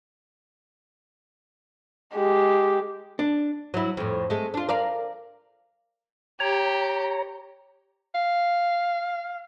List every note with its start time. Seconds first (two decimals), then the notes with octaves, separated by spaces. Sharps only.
2.15 G#3 G4
3.19 D4
3.74 F#3 E4
3.97 F2 A2
4.30 G#3 A3
4.54 D4 F4
4.69 A#4 D5 F5
6.40 G4 C#5 A#5
8.15 F5